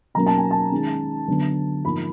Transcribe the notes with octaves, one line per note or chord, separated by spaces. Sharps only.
B2 F#3 A#3 C#4 A#5
A5
G#5
A5
D#3 G#3 C#4
D3 F#3 B3 D4
G#2 F3 A#3 B5